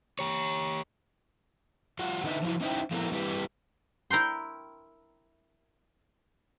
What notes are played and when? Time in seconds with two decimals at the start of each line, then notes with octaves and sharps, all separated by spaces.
0.19 G4 C#5
1.99 F#3 F4 F#5
2.24 D3 D#4 B4 D#5 E5
2.42 F3 F#3 D#4 E4
2.61 C#4 D#4 E4 F#4 C5 G5
2.91 F3 A3 B3 C4 E4 A#4
3.12 G3 C4 E4 G4 B4
4.10 E4 A#4 G5 C6